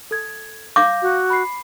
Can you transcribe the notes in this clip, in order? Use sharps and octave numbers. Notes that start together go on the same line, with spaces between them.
A4 G#6
F5 D6 G6 A#6
F#4
B5 C7